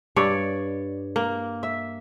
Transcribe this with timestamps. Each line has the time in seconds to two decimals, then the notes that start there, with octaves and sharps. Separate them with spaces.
0.16 G2 C#5 D5
1.16 A#3
1.63 E5